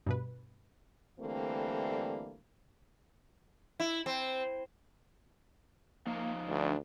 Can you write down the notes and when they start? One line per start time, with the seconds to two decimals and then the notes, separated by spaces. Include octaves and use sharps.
0.06 G2 B2 B4
1.20 D3 E3 G3 A3 A#3 C4
3.80 E4
4.06 C4
6.07 F3 A#3 D#4 F5
6.48 D2 D4